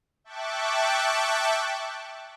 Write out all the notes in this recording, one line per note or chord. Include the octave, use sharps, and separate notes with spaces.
E5 G5 A5 C#6 D6 F#6